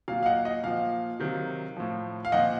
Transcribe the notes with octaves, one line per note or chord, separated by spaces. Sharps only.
A#2 F#3 F5
F5
D#5 F#5
D#5
A#2 F3 F5
C3 D#3 F#3
A2 F3
F5
A#2 F3 D#5 F#5